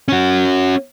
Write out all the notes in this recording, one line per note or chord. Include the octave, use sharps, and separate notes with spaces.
C#4 F#4